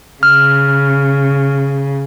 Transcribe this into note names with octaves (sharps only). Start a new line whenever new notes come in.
C#3 F6